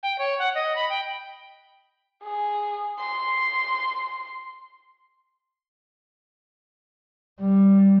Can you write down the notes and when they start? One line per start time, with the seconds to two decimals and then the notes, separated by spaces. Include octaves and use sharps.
0.03 G5
0.18 C#5
0.39 F#5
0.55 D#5
0.76 B5
0.89 G5
2.24 G#4
2.99 C6
7.40 G3